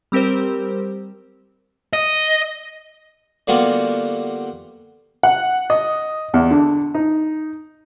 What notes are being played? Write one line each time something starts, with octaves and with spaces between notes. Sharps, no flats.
G3 C4 G4 A#4 C5
D#5
D3 G3 A#3 B3 F4 F#4
F#5
D#5
E2
D3
D#4